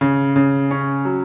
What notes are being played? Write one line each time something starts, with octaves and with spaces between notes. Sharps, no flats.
C#3
C#3
C#4
F#3